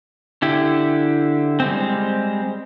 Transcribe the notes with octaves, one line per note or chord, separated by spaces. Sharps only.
D3 E4 G4
G3 G#3 C4